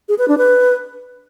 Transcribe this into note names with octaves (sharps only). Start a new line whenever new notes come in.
G#4
B4
D4
B4